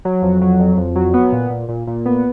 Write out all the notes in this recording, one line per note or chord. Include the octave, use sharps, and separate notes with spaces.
F#3
F2
F#3
F2
F2
F#3
B3
A#2
A#2
A#2
A#2
B3